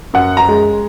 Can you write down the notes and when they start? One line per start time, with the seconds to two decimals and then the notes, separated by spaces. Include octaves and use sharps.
0.13 F#2 F#5
0.37 A#5
0.48 G#3